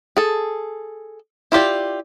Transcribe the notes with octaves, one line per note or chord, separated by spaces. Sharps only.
G#4 A4
E4 F4 G4 D5